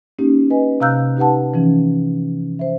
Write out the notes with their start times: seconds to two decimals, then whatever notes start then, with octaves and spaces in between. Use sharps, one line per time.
0.19 A#3 C#4 D#4 G4
0.50 B4 D#5 G#5
0.80 C3 F5 A#5 E6 F#6 G6
1.17 D#4 G4 B4 F#5 A5
1.54 E3 F3 C#4
2.59 C5 E5